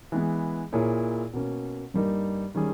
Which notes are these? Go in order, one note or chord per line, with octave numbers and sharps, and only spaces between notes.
E3 G#3 B3
A#2 A#3 E4 G#4 C#5
B2 A#3 C#4
G2 G3 A#3 D#4 A#4
D#3 G3 C#4 G#4